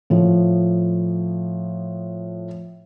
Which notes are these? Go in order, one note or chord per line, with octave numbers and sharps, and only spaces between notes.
A2 F3